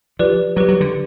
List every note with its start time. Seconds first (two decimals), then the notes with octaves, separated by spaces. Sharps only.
0.19 F3 G4 B4 D5
0.56 F#3 G4 B4 D5
0.68 F#3
0.81 D3